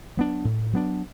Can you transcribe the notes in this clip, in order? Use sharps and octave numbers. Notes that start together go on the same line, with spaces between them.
F#3 B3 D4
A2
F#3 B3 D4